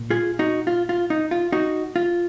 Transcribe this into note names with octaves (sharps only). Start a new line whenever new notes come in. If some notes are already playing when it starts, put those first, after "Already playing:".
Already playing: A#2
F4 G#4
D#4 F#4
F4
F4
D#4
F4
D#4 F#4
F4